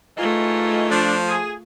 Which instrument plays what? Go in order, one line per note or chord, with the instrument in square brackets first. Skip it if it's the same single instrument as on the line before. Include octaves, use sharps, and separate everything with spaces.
[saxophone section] G#2 E3 D#5 [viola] A3 F4
[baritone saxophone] F3 [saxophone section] D4
[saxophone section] G#4